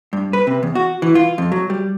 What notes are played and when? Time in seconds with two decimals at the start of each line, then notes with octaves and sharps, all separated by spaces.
0.13 G2
0.33 B4
0.47 C3
0.63 E2
0.75 F#4
1.02 E3
1.15 F4
1.38 F2
1.52 F#3
1.70 G3